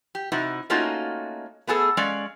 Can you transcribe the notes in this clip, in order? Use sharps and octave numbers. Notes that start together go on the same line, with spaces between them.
G4
C3 D#4 E4 F#4
A3 A#3 C#4 D#4 F4 F#4
A3 B3 G#4 A4
G#3 C#4 D5 F5